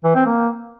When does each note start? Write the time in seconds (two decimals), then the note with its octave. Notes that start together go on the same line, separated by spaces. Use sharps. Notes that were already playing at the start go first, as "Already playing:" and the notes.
0.04 E3
0.15 C4
0.26 A#3